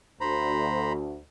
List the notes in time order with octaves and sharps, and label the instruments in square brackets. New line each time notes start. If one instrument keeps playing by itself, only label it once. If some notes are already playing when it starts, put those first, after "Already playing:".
[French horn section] D2 [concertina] C5 A#5 B5